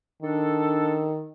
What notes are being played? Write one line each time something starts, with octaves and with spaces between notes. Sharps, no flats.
D#3 D4 A4